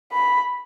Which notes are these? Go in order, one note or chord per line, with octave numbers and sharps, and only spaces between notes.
B5